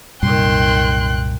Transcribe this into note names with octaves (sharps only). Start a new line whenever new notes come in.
C2 F#2 A#2 D#3 G3 G5 C6 F#6